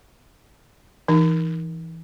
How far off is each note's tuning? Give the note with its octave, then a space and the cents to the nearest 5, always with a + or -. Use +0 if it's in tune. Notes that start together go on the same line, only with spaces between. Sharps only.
E3 +0 D#4 +0